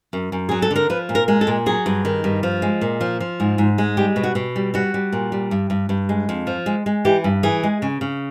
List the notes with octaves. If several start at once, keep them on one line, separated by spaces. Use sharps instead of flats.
F#2
F#2
F#3 G#4
A4
D3 A#4
F3 B4
A#2
A#4
G#3
A4
A#2
F#3 G#4
G2
D#3
G2
F3
G#3
A#2
F3
F3
G#2
G#2
G#3
G3 G4
B2
F#4
B2
G3
G3 F#4
G3
A#2
G3
G2
G2
G2
G#3
F2
F3
G#3
G#3
E3 G4
G2
E3 G#4
G#3
C#3
C#3